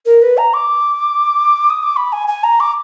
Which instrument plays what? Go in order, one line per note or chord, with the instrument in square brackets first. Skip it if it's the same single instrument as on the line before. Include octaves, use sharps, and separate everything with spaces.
[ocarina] A#4
B4
A#5
D6
D#6
D6
B5
G#5
G#5
A#5
D6